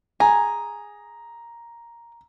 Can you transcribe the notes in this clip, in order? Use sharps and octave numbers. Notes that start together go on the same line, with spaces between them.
G#4 A#5